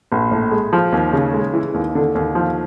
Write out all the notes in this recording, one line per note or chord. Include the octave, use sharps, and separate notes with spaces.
A#1
A2
G#3
F3
D#2
C#3
G#3
E3
D#2
D3
D#2
F3